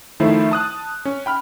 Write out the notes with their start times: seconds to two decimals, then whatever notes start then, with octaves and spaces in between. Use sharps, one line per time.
0.20 D#3 F3 A3 E4 C5
0.51 A5 D#6 F#6
1.05 C#4
1.26 G5 B5 F6